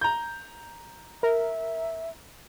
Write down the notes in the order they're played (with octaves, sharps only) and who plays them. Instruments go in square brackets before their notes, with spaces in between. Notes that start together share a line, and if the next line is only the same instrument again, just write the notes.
[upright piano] A#5 G6
[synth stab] A#4 [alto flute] E5